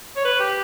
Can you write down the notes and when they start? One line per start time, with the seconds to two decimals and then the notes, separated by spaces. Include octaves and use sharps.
0.17 C#5
0.25 B4
0.40 G4